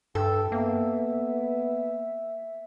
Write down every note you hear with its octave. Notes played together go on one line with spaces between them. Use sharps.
G2 A4 G5
A#3 B3 E5